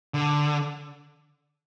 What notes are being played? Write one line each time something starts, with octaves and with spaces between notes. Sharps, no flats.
D3